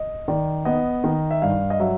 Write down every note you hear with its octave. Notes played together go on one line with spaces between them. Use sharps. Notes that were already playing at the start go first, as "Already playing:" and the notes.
Already playing: D#5
D#3 D5
B3 D#5
D#3
E5
G2 F5
D#5
F#3 E5